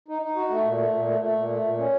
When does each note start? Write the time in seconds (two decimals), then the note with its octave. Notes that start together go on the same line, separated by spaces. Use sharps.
0.08 D#4
0.22 D#4
0.36 F#4
0.50 A3
0.64 A#2
0.79 A3
0.93 A#2
1.07 A3
1.22 A3
1.36 A#2
1.49 A3
1.64 A#2
1.78 C#4